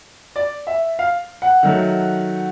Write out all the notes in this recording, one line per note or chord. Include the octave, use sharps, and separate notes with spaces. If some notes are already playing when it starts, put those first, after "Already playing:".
D5
E5
F5
F#5
D#3 F#3 A3